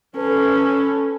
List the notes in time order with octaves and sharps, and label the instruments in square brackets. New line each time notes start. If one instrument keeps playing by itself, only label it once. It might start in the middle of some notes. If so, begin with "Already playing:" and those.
[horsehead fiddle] C#4 [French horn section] A4 B4